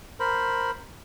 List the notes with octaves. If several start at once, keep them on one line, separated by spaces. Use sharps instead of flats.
A#4 C5 B5